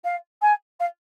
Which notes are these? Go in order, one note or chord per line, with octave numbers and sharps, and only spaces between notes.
F5
G#5
F5